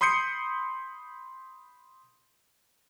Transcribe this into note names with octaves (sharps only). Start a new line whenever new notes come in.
B5 C6 D#6 G6 C7 C#7